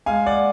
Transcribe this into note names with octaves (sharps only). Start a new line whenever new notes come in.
G#3 F5 G#5
D5 F#5